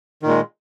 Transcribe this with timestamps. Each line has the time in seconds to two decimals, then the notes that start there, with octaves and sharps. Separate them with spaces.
0.23 D#3
0.26 A#2
0.29 G#3